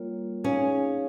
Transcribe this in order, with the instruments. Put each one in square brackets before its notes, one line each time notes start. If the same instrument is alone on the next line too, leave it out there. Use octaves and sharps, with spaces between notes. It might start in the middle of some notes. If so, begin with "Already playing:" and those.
Already playing: [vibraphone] G3 A#3 F4 A#4 C#5
[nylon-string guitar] C#4 [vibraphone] D#4 G#4 C#5 F5